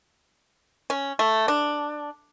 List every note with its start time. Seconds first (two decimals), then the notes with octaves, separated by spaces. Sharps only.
0.90 C#4
1.19 A3
1.48 D4